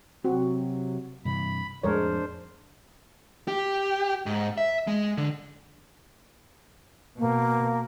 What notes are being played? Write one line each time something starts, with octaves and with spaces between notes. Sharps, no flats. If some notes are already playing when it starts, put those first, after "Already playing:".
C3 F#3 C4 F#4
G2 C3 E3 B5
F2 A2 G#3 D4 A#4 C5 C#5
G4
G#2
E5
G#3
D3
B2 A#3